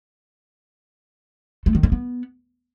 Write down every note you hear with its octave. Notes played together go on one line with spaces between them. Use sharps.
A3
D#3
A3
B3